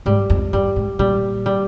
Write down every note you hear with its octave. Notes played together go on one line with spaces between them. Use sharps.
G#2 G3
F2
G2 G3
G#2
A#2 G3
G3